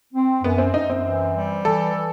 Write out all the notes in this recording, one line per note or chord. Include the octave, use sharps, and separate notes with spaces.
C4
F#2 B3
C4
F#2 D#4
C4
E3
G3
E3 A4
E3